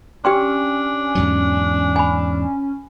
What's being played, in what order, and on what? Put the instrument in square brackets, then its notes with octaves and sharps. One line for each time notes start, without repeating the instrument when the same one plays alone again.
[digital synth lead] C#4 [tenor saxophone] D4 [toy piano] G4 G5 C6
[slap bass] E2 G#2 F#3
[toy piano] G#5 B5